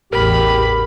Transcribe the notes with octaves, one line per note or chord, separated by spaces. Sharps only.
A1 E2 G4 A#4 B5